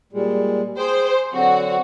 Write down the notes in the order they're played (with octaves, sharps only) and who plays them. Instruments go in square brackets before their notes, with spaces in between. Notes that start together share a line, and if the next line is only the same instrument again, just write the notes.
[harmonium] A#2 G3 G#3
[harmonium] G#4 G5 [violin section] C5
[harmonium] D3 F#3 C4 [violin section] F#4